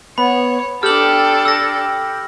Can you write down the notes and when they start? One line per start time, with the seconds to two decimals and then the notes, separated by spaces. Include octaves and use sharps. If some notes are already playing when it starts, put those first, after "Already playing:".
0.18 B3 C#5 B5
0.83 D4 G4 A4 F6 F#7
1.45 E6 A#6